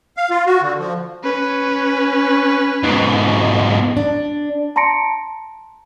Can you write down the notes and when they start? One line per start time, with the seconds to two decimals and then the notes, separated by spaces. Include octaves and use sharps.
0.17 F5
0.30 F4
0.46 F#4
0.62 D3
0.79 F3
1.23 C#4 B4
2.83 G#2 B2
3.97 D4
4.76 A5 A#5 C6 A#6 C#7 D7